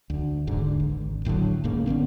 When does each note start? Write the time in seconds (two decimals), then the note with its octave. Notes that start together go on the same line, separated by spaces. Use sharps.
0.10 D2
0.47 E1 D2 G#2 D3
0.80 G#1
1.25 D1 A2 D3 F#3
1.64 G#1 G#2 C#3 A#3
1.86 D3 D#3 B3 C#4